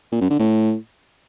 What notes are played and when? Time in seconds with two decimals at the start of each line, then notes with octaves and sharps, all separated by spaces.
0.12 A#2
0.21 F#2
0.30 D3
0.39 A2